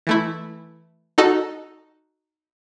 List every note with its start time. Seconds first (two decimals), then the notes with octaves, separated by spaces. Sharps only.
0.07 E3 A3 E4
1.18 D#4 F#4 A4 D#5